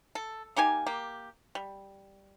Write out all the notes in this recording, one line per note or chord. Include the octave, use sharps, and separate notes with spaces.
A4
A#3 D#4 G4 G#5
A#3 G4
G3